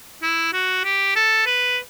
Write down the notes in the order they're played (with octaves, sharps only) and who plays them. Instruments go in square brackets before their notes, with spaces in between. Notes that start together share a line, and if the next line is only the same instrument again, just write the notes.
[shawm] E4
F#4
G4
A4
B4